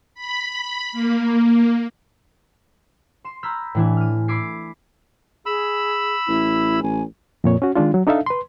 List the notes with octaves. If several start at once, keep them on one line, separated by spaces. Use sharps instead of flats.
B5
A#3
C6 E7
A#5 B5 E6 F6 G6 G#6
A2 E3 D4 G#5
F6 D#7
B5 D6 E6 G#6 C7
G#4 B5 E6
A1 E4
A1 G#5
F2 A#2 C#5
C#4 F#4
D#3 G#3 D4 F4
F#3
D4 D#4 A4 E5 F5
B4 C6